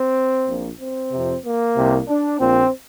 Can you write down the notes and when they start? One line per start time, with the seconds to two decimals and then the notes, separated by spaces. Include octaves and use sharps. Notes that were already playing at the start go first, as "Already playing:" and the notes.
Already playing: C4
0.47 A#1 A#2
0.79 C4
1.12 F2 C3
1.44 A#3
1.76 C2 C3
2.08 D4
2.39 A#1 A#2 C4